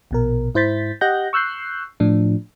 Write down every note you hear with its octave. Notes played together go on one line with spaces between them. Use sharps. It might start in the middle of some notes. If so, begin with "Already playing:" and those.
A#1 B2 A#4
G#2 E4 C5 G6 A6 B6
G4 D#5 F#5 F#6 G6 A#6
C#6 E6 F#6 G6 C7
A2 F3 D4